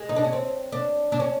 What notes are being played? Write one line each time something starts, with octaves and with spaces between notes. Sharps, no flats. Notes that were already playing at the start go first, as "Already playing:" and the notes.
Already playing: G#3
D#4
D4
C#4
C4
D4
D4
C#4